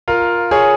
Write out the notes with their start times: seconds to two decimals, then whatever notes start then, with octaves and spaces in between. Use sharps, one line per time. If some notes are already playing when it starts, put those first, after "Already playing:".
0.08 F4 A#4
0.51 G#4 C#5